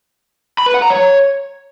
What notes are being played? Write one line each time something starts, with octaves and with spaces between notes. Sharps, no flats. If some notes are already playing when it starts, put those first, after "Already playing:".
B5
B4
F#5
A#5
C#5